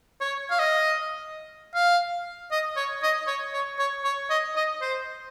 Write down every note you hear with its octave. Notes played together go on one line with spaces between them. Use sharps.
C#5
F5
D#5
F5
D#5
C#5
D#5
C#5
C#5
C#5
C#5
D#5
D#5
C5